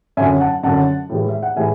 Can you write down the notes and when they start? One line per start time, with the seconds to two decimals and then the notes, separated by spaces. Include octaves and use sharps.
0.17 F#2 D3 F#3 E5 G#5
0.40 F#5 A5
0.63 F#2 D3 F#3 F#5 A5
1.09 A2 E3 G#3
1.29 E5
1.43 F#5
1.56 A2 E3 G#3 E5 G#5